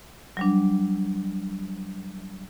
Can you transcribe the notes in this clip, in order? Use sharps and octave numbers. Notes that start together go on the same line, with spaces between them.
F#3 G3 D4